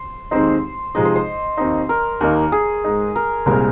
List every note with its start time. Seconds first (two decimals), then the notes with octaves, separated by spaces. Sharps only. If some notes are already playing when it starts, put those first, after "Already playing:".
Already playing: C5
0.31 D#2 D#3 G#3 C4 D#4 C5
0.95 C3 F3 G#3 D#4 D#5
1.05 C5
1.16 C5
1.57 D#2 D#3 C4 D#4
1.89 A#4
2.20 D#2 D#3 A#3 D#4
2.52 G#4
2.84 G#2 G#3 D#4
3.16 A#4
3.46 C2 A#2 G#3 C4 A#4